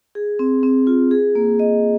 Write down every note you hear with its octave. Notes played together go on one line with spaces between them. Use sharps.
G#4
C4
C4
F4
G#4
A#3
D#5